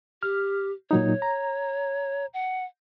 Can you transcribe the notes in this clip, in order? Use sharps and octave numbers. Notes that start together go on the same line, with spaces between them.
G4 F6
A#2 F#3 D#4 C#5
A#5
F#5